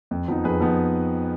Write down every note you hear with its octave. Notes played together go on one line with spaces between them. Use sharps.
F2
F3 B3 D#4
F2 G#4 B4
F3 B3 D#4